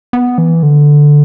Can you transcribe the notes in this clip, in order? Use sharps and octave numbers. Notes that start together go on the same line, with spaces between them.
B3
E3
D3